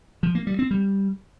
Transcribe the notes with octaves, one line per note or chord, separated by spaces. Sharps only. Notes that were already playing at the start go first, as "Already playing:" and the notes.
F3
A#3
G3
C4
G3